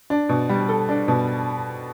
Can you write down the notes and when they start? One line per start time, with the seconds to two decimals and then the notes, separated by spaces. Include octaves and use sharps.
0.10 D4
0.29 B2
0.49 G3
0.69 A4
0.89 D4
1.08 B2